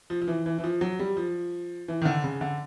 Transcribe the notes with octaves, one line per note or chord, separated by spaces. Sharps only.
F3
F3
E3
E3
E3
F3
F#3
G3
F3
E3
D#3
D3
C#3
D3